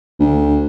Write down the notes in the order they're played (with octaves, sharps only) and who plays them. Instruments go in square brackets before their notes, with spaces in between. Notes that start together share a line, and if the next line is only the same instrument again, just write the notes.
[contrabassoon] D2